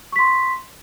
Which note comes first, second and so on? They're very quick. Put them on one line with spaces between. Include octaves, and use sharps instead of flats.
C#6 B6 C6